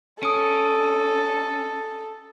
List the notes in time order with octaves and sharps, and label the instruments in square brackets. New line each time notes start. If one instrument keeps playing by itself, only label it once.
[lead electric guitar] C#4 [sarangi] A4 [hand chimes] D#6 D7